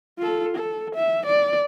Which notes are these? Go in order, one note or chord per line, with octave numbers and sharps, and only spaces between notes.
F4 A4
A4
E5
D5